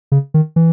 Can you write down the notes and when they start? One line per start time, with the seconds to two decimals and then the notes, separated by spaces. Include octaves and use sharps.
0.12 C#3
0.34 D#3
0.56 E3